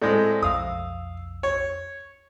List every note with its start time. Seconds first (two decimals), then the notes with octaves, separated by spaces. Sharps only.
0.02 A2 G#3 C4 A4 D5 G6
0.42 B1 F2 F5 D#6 E6
1.43 C#5